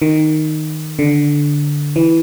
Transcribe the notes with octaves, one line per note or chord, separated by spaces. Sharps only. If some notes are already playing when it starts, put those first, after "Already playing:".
D#3
D3
E3